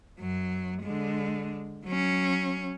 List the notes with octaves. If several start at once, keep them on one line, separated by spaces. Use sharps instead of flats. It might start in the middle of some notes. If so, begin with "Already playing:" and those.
F#2 F#3
D3 G#3
F#3 C#4